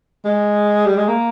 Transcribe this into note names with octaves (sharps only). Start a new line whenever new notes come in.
G#3
G3
G#3
A#3